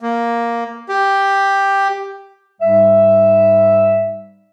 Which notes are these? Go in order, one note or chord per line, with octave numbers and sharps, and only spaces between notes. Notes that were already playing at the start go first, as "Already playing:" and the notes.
A#3
G4
G#2 G3 E5